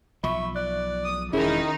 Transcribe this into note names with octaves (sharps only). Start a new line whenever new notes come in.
B1 F3 E5 B5 C#6
D5 F#6
D#6
E1 D#3 C#4 D#4 E4 G#4